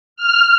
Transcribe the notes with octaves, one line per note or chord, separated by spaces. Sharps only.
F6